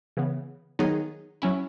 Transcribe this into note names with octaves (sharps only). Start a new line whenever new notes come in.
C#3 E3 B3
D#3 F#3 B3 D#4 G#4
F#3 C#4 E4